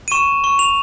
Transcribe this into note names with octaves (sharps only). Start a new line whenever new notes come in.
D#7
C#6 E7
C#6
F7